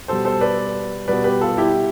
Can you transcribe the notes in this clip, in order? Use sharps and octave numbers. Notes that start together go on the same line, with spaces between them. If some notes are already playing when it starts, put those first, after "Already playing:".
B2 G3 A4 C5
A4 C5
B4 D5
B2 G3 B4 D5
G4 B4
F4 A4
E4 G4